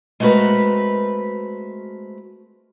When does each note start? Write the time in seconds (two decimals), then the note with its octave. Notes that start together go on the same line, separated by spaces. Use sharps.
0.20 G#3 A3 C4 F#4 A#4 B4